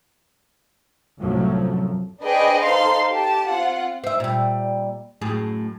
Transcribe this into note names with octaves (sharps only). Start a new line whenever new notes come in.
C2 F#2 A2 F3 F#3 A3
D4 G#4 B4 C5 D#5 G5
D#4 A4 C5 F5 C6
G4 A5
C4 F4 F#5
C5 E5
A#2 G3
F#2 A2 G#4